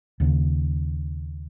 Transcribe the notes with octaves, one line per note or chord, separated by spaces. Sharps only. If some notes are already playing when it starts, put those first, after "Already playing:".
D#2 C#3